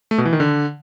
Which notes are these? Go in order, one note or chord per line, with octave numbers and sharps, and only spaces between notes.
A3
B2
E3
D#3
D3